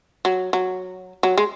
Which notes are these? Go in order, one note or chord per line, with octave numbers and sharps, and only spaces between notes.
F#3
F#3
F#3
G#3